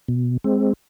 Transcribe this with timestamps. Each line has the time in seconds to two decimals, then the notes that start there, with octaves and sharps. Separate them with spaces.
0.08 B2
0.44 G#3 C4